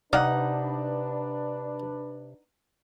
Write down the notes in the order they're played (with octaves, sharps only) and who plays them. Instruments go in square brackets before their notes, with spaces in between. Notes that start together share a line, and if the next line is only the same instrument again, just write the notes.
[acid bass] C3 [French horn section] D4 B4 [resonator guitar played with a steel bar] D#4 F#5 [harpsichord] D5 F5